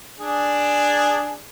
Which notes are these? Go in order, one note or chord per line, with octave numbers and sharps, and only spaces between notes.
D4 G#4